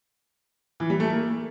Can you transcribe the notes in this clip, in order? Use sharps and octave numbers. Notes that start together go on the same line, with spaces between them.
E3
G3
A3
A#3